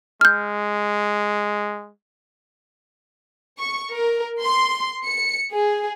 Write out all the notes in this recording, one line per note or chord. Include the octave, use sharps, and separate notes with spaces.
G#3 F6 G6
C#6
A#4
C6
C#7
G#4